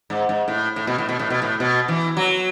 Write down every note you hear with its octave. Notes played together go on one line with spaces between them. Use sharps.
G#2
G#2
A2
A2
B2
A2
B2
A2
B2
A2
B2
E3
F#3